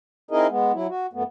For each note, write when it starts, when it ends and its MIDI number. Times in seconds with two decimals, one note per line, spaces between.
0.31 0.47 60
0.31 0.47 63
0.31 0.47 64
0.31 0.47 68
0.31 0.47 70
0.31 0.47 75
0.49 0.72 56
0.49 0.72 59
0.73 0.87 54
0.73 0.87 64
0.89 1.07 66
1.13 1.23 42
1.13 1.23 57
1.13 1.23 59